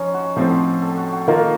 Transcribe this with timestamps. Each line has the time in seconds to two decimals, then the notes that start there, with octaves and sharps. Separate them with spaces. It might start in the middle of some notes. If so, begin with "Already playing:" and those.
Already playing: F3 C#4 D#4
0.14 F#4
0.36 A2 F3 C4
0.82 A4
0.97 F#4
1.12 F#4
1.28 D#3 A#3 F4 A4 A#4